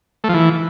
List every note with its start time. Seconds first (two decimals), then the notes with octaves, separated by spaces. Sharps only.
0.24 A3
0.29 F3
0.34 E3